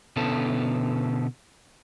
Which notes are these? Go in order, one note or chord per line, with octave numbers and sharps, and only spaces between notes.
B2 D3 B3 C#4 E4 A4